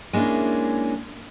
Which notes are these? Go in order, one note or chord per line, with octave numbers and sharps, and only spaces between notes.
G#3 A#3 C#4 D4 E4